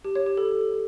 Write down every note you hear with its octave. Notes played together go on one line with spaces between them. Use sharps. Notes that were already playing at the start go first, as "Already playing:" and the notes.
G4
C#5
G4
A4